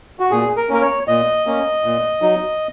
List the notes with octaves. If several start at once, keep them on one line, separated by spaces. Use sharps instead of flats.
F#4
A#2 G#4
A#4
A#3 C#4 A#4
C#5
A#2 D#5
A#3 C#4
A#2
F#3 D#4